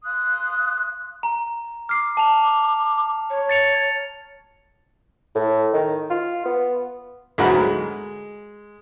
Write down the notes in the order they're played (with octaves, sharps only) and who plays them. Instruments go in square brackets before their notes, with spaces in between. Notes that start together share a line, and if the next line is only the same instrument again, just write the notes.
[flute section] F5 C6 D#6 F#6
[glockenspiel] A#5
[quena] D6 [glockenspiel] F6 C7
[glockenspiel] A5 F7
[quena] C#5
[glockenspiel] A6 C#7 F7
[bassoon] A2
D#3
F4
B3
[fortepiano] D2 G#2 F#3 A#4 F#5 B5
G#3